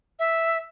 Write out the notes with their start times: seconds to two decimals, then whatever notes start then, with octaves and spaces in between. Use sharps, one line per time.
0.19 E5